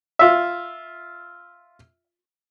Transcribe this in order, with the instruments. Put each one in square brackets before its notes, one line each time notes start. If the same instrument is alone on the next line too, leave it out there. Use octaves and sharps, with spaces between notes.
[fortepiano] F4 E5